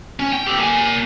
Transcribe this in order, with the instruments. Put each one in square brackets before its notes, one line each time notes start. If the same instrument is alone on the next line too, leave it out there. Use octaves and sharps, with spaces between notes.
[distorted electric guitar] C#4
G5
G4 A4
A#3 G#5